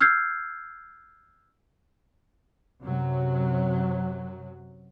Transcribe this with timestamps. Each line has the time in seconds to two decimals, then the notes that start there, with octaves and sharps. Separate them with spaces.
0.01 E6 F6 G6 G#6 C7
2.82 F#2 C3 F#3